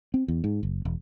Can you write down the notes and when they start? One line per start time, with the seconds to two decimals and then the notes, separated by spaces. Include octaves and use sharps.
0.14 C4
0.28 E2
0.44 G#2
0.63 F#1
0.85 E1